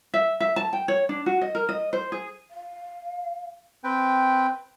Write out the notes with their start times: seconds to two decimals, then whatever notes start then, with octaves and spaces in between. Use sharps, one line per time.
0.14 E5
0.40 E5
0.56 A5
0.73 G5
0.88 C#5
1.09 D4
1.26 F#4
1.41 D#5
1.55 A#4
1.69 D#5
1.93 C5
2.12 G#4
2.51 F5
3.84 C4 B4 G5